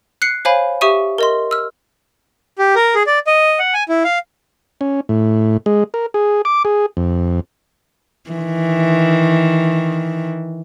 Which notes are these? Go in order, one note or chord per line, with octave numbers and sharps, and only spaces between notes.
F#6 C7 C#7
C5 C#5 F5 G#5 B5
G4 E5 C#6 D#6 D#7
A#4 D#5 C6
E6 F6
G4
A#4
G#4
D5
D#5
F#5
G#5
E4
F5
C#4
A2
G#3
A#4
G#4
D6
G#4
F2
D#3 E3